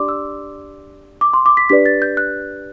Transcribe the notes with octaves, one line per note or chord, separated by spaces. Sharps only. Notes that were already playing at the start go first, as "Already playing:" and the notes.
Already playing: D4 G4 D5 C6 D6
E6
D6
C6
D6
B6
D4 G4 B4 D5 B6
A6
G6
F#6